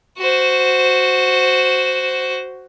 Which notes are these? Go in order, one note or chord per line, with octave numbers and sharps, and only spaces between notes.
F#4 C5